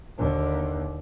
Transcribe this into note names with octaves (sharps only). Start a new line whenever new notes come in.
D#2 D3